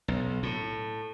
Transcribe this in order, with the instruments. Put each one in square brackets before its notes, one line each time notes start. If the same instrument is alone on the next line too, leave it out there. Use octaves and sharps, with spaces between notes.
[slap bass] B1
A2